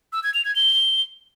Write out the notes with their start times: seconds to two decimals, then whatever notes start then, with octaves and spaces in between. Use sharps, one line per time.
0.13 E6
0.23 G#6
0.34 F7
0.45 G#6
0.56 G7